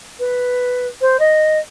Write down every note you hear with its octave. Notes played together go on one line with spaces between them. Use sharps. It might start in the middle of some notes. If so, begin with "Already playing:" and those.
B4
C5
D#5